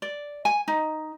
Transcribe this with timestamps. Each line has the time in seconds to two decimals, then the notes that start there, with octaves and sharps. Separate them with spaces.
0.02 D5
0.45 G#5
0.68 D#4